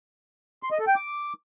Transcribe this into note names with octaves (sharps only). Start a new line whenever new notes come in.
C6
D#5
A4
G5
D6